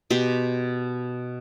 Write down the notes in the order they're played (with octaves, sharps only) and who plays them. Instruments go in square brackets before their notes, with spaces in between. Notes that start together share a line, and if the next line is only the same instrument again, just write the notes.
[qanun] B2 G4 C6